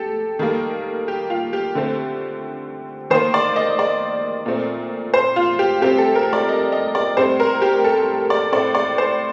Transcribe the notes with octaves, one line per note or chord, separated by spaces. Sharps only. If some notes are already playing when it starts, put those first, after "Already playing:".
Already playing: G4 A4
D#3 G3 A#3
G4
F4
G4
D3 A3 C4
D#3 A#3 C5
D5
D#5
D5
A#2 A3 C4
C5
F4
G4
C3 G3 C4 G4
A4
A#4
D5
D#5
D#5
D5
A2 G3 C4 C5
A#4
G4
A4
D5
A2 A3 C4 D5
D5
C5